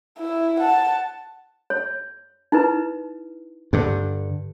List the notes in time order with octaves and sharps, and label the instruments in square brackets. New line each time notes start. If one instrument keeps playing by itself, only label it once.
[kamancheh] E4
F#5 A5
[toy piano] C#5
D#4 E4 B4
[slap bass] G2 D3